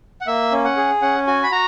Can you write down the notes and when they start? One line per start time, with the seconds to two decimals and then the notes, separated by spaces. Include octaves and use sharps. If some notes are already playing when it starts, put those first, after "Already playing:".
0.21 F#5
0.27 A#3 E5
0.52 C#4
0.64 F#5
0.77 G#4
1.02 C#4 F#5
1.27 F#4 G#5
1.43 B5
1.52 F#4 A#5